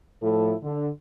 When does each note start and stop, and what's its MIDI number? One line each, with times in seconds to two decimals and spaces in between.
0.23 0.54 45
0.23 0.54 53
0.23 0.54 64
0.23 0.54 69
0.63 0.88 50